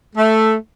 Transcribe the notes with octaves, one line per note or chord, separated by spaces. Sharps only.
A3